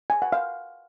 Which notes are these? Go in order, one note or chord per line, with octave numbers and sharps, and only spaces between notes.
G#5
F#5
F5